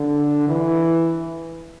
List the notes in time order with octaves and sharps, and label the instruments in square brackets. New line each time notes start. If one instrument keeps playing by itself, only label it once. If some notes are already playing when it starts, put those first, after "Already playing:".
Already playing: [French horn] D3
E3